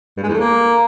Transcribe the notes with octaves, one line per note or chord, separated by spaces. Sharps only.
G2
G#3
E2
A3
A#3